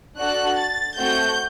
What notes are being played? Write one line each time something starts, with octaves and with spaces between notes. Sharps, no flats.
D4 F#4 A4 F#6
A6
A3 C4 F#4 A4 G6